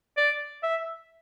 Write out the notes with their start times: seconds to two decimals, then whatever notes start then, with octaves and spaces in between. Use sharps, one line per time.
0.17 D5
0.63 E5